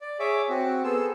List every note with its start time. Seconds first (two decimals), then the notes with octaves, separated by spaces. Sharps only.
0.01 D5
0.19 G#4 C#5 E5 D6
0.49 C4 F#4
0.84 B3 G#4 A4 C5 E6